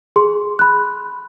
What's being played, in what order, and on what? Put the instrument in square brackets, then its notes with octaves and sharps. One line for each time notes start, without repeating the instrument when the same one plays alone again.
[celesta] G#4 C6
B5 F#6